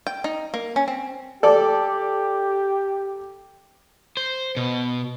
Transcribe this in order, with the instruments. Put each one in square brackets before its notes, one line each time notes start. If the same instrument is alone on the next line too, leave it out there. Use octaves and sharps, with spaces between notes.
[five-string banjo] G5
D#4
A#3
C#4
C4
[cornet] G4 [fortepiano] A4 D5
[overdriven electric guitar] C5
B2